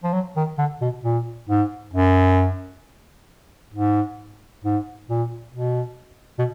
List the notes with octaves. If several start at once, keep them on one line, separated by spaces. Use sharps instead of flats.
F3
F#3
D#3
D3
B2
A#2
G#2
F#2
G#2
G#2
A#2
B2
B2